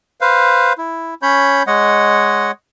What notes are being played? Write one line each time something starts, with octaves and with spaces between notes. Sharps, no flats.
B4 C5 F5
E4
C#4 C#5 B5 G6
G#3 C#5 D#5 F#5